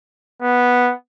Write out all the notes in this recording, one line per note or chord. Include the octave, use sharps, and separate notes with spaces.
B3